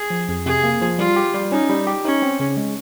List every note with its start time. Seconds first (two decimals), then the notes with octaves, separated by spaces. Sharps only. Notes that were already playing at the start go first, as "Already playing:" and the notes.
Already playing: G#4
0.10 F3
0.28 F2
0.46 C3 G#4
0.64 A#3
0.81 F3
0.98 G3 F4
1.16 G4
1.34 G3
1.51 C#4 D#4
1.69 G3
1.87 G4
2.05 C#4 D#4
2.22 C4
2.40 C#3
2.57 G#3